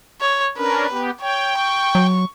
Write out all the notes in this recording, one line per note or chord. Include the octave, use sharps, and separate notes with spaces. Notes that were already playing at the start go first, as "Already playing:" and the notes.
C#5
C#4 D4 A#4 B4
B3 G4
C#5 G5
C#6
F#3